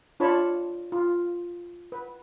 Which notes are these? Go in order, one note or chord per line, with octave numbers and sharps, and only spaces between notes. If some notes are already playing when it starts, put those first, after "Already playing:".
D4 F4 C#5 A5 B5
F4
B4